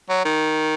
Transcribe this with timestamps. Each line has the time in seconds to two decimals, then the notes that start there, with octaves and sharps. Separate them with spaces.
0.09 F#3
0.25 D#3